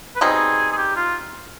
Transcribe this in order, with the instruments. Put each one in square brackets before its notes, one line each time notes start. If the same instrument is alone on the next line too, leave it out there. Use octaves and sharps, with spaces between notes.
[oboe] B4
[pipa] B2 G3 C4 D#4 [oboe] G#4
[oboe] G#4
G4
F4